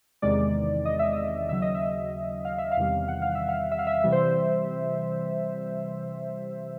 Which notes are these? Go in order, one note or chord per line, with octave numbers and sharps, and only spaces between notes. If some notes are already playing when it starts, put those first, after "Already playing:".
E2 C3 D#3 G#3 D5
D#5
E5
D#5
D#2 C#3 F#3 E5
D#5
E5
F5
E5
F5
E2 C3 D#3 G3
F#5
F5
E5
F5
E5
F5
E5
C3 E3 G3
C5